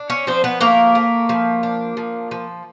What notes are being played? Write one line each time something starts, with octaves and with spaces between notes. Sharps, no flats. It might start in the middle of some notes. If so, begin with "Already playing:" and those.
Already playing: D4
C#4 C#5
F3 C4 C5
B3 B4
A3 A#3 A#4
A3
F3
D4
F3
F3